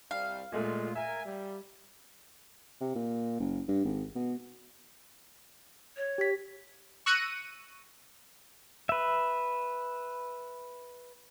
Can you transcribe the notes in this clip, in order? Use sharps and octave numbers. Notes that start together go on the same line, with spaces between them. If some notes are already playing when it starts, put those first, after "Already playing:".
C2 G3 F5
A#2 G#3 A3 F4
A#4 E5 G#5
G3
C3
A#2
F#1
G2
G#1
B2
C#5
G4 B6
C#6 E6 F#6 A#6 C#7 D#7
B4 E5